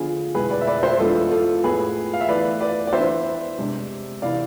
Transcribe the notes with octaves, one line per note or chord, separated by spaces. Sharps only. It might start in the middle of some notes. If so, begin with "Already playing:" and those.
Already playing: D3 F3 B3 D4 F4 G#4
B2 G#3 B3 E4 G#4 B4
B4 D5
E5
B4 D5
C5 E5
E3 G#3 B3 D4 F4 A4
F4 A4
A2 F3 B3 E4 G#4 B4
F5
E5
E3 A3 E4 B4 D5
B4 D5
D5
E3 B3 D4 C5 E5
C3 G#3 D4
C3 E3 B3 E4 D5 F5